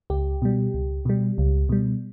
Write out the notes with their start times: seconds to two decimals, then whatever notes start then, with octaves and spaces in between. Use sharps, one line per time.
0.10 C#2 G4
0.42 B2 G3
0.74 C#2
1.05 B2 G3
1.38 C#2
1.69 B2 G3